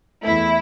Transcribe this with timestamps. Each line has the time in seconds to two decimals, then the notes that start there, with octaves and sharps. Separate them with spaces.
0.23 E2 E3 A3 E4